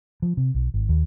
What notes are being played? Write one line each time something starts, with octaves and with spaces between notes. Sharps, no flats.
F3
C3
B1
G#1
D#2